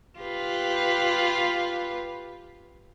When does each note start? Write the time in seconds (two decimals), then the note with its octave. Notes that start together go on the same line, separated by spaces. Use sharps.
0.19 F4 G4 B4